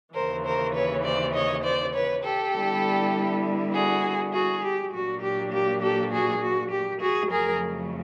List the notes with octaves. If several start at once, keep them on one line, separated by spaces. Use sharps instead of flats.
D#2 C#3 E3 A#4 C5
A#4 C5
B4 C#5
C5 D5
C#5 D#5
C5 D5
B4 C#5
G4 A4
D3 G3 B3 E4
F#4 G#4
F#4 G#4
G4
A#2 F#3 A#3 D4 F#4
G4
G4
G4 A4
F#4 G#4
F#4
G4
F#4 G#4
F2 C#3 F#3 A3 G#4 A#4